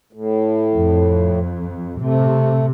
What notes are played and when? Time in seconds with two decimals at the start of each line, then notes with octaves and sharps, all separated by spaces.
0.13 A2
0.73 F2
2.02 C3 A3